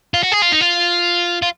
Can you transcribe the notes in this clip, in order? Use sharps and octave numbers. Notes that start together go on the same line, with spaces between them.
F4
F#4
G#4
F4
D#4
F4
F4